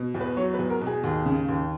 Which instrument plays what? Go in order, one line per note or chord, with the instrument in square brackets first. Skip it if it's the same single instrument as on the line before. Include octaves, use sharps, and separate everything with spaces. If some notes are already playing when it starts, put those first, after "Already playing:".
Already playing: [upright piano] B2
E2
B4
F#3 C#5
B4
E2
A#4
B2
G#4
D#2
C#3
D#2